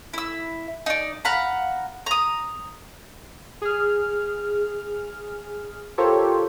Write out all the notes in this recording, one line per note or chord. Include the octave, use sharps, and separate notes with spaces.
E4 E6
D#4 D5
F5 F#5 A#5 B5
A#5 D#6
G#4 F6
F4 G4 A4 A#4 C5 C#5